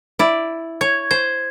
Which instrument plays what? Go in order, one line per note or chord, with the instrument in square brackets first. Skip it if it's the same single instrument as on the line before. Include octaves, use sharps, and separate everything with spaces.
[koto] E4 D5
[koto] C#5 [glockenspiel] G#6
[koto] C5 [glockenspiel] G#6